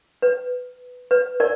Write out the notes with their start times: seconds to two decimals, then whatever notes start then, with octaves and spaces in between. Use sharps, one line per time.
0.22 B4
1.11 B4
1.40 A#4 D5